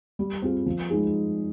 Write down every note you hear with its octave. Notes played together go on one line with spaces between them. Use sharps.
G3
C4 F4 G#4
F3
G#3 D#4 G#4